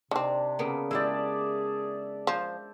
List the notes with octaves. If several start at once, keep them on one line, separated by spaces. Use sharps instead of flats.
C3 D#3 C4 D4
C#3 A#3 B3
G#3 E4 G4 G#4 D5 E5
F3 C5